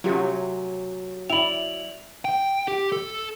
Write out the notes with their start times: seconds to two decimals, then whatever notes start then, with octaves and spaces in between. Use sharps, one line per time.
0.04 C3 F#3 A3 C#4 F4 G4
1.30 E4 D5 G5 B5 F7 F#7
2.25 G5
2.68 G4
2.92 A4